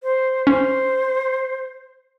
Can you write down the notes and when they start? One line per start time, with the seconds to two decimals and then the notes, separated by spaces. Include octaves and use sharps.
0.03 C5
0.47 C#4 C5